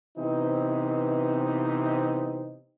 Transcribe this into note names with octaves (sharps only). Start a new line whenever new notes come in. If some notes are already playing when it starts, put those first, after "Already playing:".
C3 E3 B3 C4 D#4